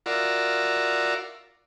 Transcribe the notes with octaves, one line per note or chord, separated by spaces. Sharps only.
F4 F#4 A#4 D5 E5